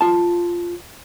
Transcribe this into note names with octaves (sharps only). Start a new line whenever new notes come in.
F4 A5